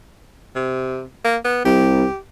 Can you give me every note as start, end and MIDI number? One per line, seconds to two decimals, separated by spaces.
0.55 1.05 48
1.25 1.37 58
1.44 1.64 59
1.65 2.05 36
1.65 2.17 67